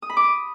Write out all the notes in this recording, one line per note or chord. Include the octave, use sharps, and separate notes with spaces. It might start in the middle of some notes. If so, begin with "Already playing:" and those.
D#6
B5
D6
D#6